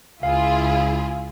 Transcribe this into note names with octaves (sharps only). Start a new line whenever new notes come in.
C#2 E4 F4 G#4 F5